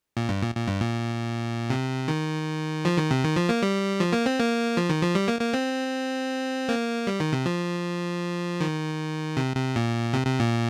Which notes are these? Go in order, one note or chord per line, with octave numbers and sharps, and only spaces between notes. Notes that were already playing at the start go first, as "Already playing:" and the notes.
A#2
G2
A#2
A#2
G2
A#2
C3
D#3
F3
D#3
C3
D#3
F3
A#3
G3
F3
A#3
C4
A#3
F3
D#3
F3
G3
A#3
A#3
C4
A#3
G3
D#3
C3
F3
D#3
C3
C3
A#2
C3
C3
A#2